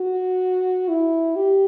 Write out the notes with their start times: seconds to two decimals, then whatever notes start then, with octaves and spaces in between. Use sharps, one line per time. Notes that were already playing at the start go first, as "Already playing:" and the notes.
Already playing: F#4
0.88 E4
1.36 G4